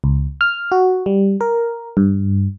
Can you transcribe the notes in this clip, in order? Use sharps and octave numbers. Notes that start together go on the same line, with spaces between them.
C#2
F6
F#4
G3
A#4
G2